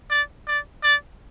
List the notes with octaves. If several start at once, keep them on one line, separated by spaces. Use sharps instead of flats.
D5
D5
D5